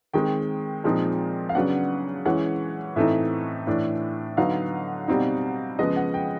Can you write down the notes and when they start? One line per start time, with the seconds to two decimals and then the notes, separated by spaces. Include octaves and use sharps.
0.14 D#3 G#3 C4 G5
0.84 A#2 F3 G#3 C4 D#4
1.49 F5
1.55 C#3 F#3 B3 D4 F#5
2.25 E3 G#3 C#4 F#5
2.96 A2 E3 A3 C4 D#4 E5
3.67 A2 E3 A3 D4
4.37 D3 F#3 B3 D#4 F5
5.08 B2 G3 C4 D#4
5.79 C#3 F3 G#3 B3 D#5
5.96 F#5
6.14 G5